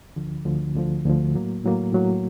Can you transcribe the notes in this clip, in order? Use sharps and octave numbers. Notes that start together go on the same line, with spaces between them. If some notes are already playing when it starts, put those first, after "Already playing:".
D2 D3 F3
D2 D3 F3
D2 D3 F3
D2 D3 F3
A2 F#3 A#3
A2 F#3 A#3
A2 F#3 A#3